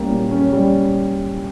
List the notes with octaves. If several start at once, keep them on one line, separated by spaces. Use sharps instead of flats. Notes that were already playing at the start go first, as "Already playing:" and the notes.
Already playing: G3 A#3 C#4
A#2
C#4
G3